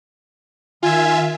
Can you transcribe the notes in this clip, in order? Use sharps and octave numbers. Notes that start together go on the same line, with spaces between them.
D#3 F4 E5 G#5